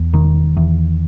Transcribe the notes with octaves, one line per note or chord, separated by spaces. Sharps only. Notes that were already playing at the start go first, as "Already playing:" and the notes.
Already playing: E2
E1 D#3
E2